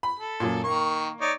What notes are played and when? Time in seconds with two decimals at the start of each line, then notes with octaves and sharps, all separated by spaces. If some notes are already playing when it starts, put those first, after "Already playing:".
0.03 B5
0.19 A4
0.40 F#2 A#2
0.64 D#3 A#3 C#6
1.21 D#4 C#5 D5